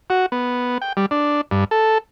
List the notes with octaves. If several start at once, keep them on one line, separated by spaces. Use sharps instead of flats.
F#4
B3
G5
G3
D4
G2
A4